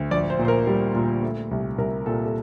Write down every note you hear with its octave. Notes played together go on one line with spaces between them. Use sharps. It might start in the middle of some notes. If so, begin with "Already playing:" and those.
Already playing: D2
A#1 D5
C5
A#2
C5
A#4
G3
A#2
A3
C2
C2 A#4
A#2 A4
A4